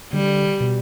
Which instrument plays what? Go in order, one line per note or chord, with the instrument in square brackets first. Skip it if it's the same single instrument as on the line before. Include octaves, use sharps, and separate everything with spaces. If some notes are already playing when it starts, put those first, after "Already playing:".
[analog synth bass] D3 [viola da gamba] G3
[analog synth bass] B2